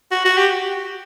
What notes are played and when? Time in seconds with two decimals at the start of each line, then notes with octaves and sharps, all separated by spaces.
0.12 F#4
0.25 F#4
0.38 G4